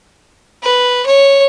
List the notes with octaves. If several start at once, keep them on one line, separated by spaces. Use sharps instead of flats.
B4
C#5